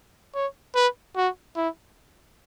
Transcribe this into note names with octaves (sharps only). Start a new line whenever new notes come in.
C#5
B4
F#4
E4